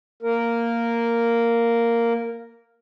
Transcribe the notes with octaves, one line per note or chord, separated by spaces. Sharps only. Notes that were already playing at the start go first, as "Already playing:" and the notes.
A#3 A#4